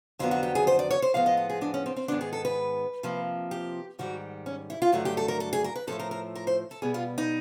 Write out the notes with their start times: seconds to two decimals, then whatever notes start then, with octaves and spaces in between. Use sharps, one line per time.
0.19 F2 D3 F#3 B3 F4
0.31 F#4
0.43 G4
0.55 G#4
0.67 C5
0.79 D5
0.91 C#5
1.02 C5
1.14 A2 F3 G#3 B3 F5
1.26 D#5
1.37 A4
1.50 G#4
1.61 D4
1.74 C#4
1.86 C4
1.96 C4
2.08 G#2 D#3 G#3 B3 D4
2.21 G#4
2.33 A4
2.45 B4
3.03 C3 F3 A#3
3.51 G4
3.99 G#2 D#3 G3 F#4
4.46 C#4
4.70 E4
4.82 F4
4.92 G2 D3 F#3 A3 F#4
5.05 G4
5.17 A4
5.28 A#4
5.40 A4
5.53 G#4
5.64 A#4
5.76 B4
5.87 A2 F3 A3 A4
6.00 A#4
6.11 A#4
6.35 A#4
6.47 C5
6.71 A4
6.82 B2 G3 B3 G#4
6.94 F4
7.18 D#4